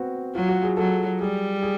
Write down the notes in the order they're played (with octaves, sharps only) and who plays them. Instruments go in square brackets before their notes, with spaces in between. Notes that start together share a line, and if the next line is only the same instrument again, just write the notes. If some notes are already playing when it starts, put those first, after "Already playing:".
Already playing: [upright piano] B3 C4 F#4
[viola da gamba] F#3 [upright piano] F4
[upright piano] F#4
G#4
[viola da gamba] F#3 [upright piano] A4
[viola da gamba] G3 [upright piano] G#4
[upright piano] G#4